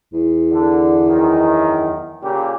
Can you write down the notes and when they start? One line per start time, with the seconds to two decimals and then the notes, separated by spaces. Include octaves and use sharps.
0.13 E2
0.52 D3
1.07 F#2 D#3
2.23 A#2 C#3 G4